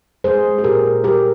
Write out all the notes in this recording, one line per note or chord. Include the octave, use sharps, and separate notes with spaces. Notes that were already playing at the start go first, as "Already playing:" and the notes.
G#3 G#4 C5
G#3
G#4
A#2 G4 A#4
A#2
G3 G4 A#4